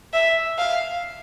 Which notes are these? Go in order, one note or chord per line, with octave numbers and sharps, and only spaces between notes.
E5
F5